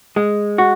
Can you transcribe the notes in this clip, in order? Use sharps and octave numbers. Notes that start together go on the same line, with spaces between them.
G#3
F#4